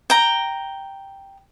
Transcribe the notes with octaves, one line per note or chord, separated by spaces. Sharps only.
G5 A#5